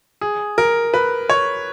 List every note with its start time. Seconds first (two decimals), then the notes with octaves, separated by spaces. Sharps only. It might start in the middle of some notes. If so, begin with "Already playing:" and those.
0.21 G#4
0.58 A#4
0.94 B4
1.30 C#5